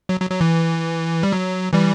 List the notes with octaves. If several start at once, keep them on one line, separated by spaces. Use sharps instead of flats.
F#3
F#3
F#3
E3
G3
F#3
E3 G3